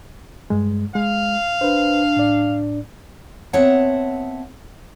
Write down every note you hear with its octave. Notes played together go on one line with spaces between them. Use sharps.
G2 G#3
G#3 F5
D4 B4 C5
A2 D5
B3 C4 C#5 E5 F#5 A5